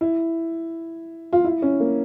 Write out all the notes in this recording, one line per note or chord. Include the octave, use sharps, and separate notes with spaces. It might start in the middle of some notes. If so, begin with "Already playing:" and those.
E4
F4
E4
C#4
A#3